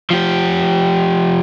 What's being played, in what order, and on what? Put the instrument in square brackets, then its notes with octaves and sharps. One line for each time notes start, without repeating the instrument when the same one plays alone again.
[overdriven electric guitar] F3 G4